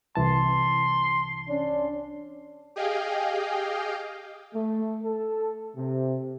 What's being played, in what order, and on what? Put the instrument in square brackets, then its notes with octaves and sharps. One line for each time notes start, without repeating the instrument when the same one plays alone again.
[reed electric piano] C2 E3 A5 [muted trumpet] C6
[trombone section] C#4 D4
[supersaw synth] G4 G#4 D#5 F5 G5
[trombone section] A3
A4
C3